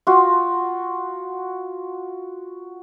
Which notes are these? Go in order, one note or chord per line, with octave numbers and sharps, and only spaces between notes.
F4 F#4